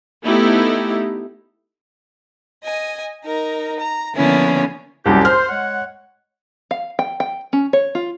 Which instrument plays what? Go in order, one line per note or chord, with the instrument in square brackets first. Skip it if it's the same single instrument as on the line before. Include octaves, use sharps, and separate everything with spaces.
[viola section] A3 B3 D#4 E4 G4
[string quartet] D#5 G#5
D#4 A#4
A#5
D3 F3 A#3 B3 C#4 E4
[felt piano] C2 F#2 G3 [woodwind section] A#3 D4 G4
[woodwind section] C5 [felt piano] F6
[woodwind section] G#3 C#5 F#5
[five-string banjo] F5
G5
G5
C#4
C#5
F4